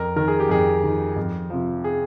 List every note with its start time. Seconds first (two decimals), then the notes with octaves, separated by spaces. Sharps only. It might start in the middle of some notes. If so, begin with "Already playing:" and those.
Already playing: F2 A#4
0.16 D#3 A#4
0.28 G#4
0.40 G4
0.49 F2 G#4
0.84 D#3
1.16 F2
1.50 C3 F3
1.84 G#4